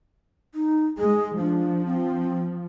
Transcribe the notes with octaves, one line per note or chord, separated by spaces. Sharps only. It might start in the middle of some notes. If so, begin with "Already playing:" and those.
D#4
G#3 G#4
F3 D4
C4